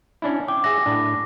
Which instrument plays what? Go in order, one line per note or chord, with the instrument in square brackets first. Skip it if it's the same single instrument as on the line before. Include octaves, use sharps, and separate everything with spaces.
[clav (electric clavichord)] C#4 D4 E4
[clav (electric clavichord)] G5 [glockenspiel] D6
[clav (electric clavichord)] G#4 E5 F#5 [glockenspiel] A#6
[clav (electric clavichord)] A2 D4